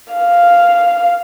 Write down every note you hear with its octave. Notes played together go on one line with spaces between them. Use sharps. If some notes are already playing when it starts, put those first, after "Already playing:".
F5